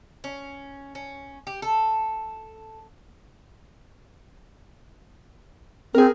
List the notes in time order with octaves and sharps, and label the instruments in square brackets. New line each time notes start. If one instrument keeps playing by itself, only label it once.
[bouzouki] C#4
C#4
G4
A4
[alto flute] C4 [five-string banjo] G#4 A#4